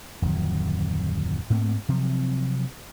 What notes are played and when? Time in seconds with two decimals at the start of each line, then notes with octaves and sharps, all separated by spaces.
0.22 D1 F2 D#3 F#3
1.50 G#2 A3 A#3 C4
1.89 C3 F3 F#3 C4